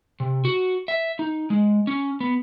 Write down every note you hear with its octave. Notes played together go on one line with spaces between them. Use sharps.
C3
F#4
E5
D#4
G#3
C#4
B3